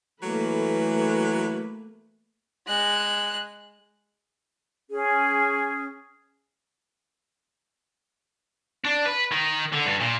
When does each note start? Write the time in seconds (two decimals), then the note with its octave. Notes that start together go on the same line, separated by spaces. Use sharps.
0.23 E3 F#3 A3 A#3 B4
2.67 G#3 F#6
4.90 C#4 G#4
8.84 D4
9.05 B4
9.32 D#3
9.72 D3
9.86 G2
10.00 A#2